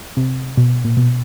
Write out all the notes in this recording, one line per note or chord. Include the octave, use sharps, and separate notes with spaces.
C3
B2
A#2
B2